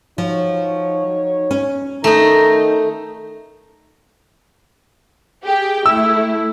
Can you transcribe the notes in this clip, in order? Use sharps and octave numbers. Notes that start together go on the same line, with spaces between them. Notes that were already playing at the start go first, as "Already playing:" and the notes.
F3 D#4 F#4 C#5
C#4
D#3 A3 D#4 A#5
G4 G#4 G5
A3 E4 E6